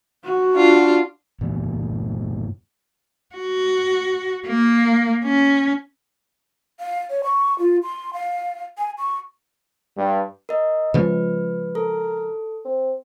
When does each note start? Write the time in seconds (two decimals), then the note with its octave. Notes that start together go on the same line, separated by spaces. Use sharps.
0.25 F#4
0.54 D4 F4
1.40 G2 A#2 E3
3.35 F#4
4.47 A#3
5.24 C#4
6.80 F5
7.10 C#5
7.24 C#6
7.59 F4
7.83 C6
8.14 F5
8.78 G#5
8.98 C#6
9.97 G2
10.49 A#4 D#5
10.94 C#3 F3 G#3 B4
11.75 A4 A#4
12.65 C4